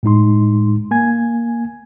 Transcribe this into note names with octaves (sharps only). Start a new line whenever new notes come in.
A2 G#3 D#4 C6
A#3 G#5 G#6